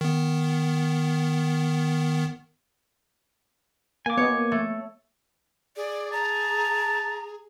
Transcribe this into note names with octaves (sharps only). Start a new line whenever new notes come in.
D#3 B3
A#3 G#5 D6
B3 C#5 D#5
A3
G#4 D5
A5 A#5